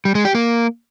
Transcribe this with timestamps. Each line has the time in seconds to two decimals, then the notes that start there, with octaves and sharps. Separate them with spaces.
0.05 G3
0.15 G#3
0.25 G4
0.35 A#3